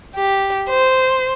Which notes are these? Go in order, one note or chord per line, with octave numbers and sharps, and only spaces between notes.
G4
C5